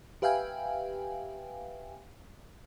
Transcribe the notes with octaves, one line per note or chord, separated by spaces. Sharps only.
G4 B4 E5 F5 G5 G#5